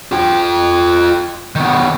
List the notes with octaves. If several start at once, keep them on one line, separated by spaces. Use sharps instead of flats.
F4 G5
D#3 B3